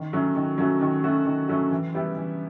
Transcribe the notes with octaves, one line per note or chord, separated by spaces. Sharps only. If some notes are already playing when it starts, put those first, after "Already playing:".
Already playing: D#3
F#3 A3 C#4 F#4
D#3
F#3 A3 C#4 F#4
D#3
F#3 A3 C#4 F#4
D#3
F#3 A3 C#4 F#4
E3
G3 B3 E4 G4
E3